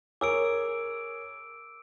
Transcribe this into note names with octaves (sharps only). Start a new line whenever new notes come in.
G#4 A#4 C#5 D6 E6 D7